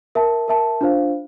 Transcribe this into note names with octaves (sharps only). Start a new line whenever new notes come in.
A#4 E5 A5
A#4 E5 A5
D4 F4 C5 F5